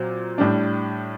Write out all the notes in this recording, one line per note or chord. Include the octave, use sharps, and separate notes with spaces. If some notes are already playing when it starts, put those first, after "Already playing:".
Already playing: A#2 F#3 C4
A2 G3 D4